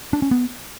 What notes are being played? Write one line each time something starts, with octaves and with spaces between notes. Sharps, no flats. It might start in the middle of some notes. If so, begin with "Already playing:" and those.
D4
C#4
B3